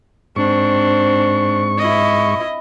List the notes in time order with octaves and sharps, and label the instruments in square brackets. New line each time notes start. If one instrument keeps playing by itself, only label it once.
[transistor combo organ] G#2 C#6 [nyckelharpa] C4 D4
[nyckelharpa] E4 D#5